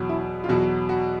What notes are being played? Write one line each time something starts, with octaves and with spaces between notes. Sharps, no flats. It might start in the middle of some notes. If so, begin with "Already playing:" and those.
Already playing: E2 B2 F#3
E4
F4
E2 B2 F#3 F#4
F#4